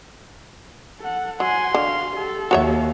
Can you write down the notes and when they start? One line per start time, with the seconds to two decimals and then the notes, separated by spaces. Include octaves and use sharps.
1.00 A4 F#5
1.40 F#3 F#5 G#5 C6
1.74 D3 F#4 F5
2.14 G4 A4
2.51 D#2 F#4 C#5 E5